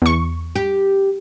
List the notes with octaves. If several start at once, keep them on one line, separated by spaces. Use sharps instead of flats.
E2 C#6
G4